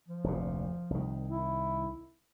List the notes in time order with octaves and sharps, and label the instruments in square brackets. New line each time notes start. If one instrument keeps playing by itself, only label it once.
[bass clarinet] F3
[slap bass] F1 D2 A#2
C2 D#3
[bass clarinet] E4